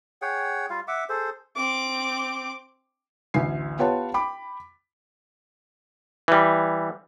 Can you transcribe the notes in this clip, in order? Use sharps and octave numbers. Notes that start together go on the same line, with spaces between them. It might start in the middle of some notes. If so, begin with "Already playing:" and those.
G#4 C#5 F#5 G5
G3 F4 F5
E5 F#5 D6
G#4 A4 C5
C4 D6
A1 D2 G#5 C7
B3 F4 G4 C#5 F#5 A5
G5 B5 D6
E3 G3